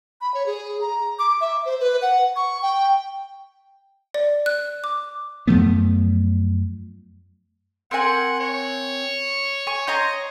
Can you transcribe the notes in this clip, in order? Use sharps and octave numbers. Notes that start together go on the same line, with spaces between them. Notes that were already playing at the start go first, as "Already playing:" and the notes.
B5
C#5
G#4
A#5
D6
E5
C5
B4
F#5
C#6
G5
D5
F#6
D6
F#2 F3 A3 B3
C4 A#4 F#5 G#5
C#5
G#5 C#6
C5 C#5 D#5 A#5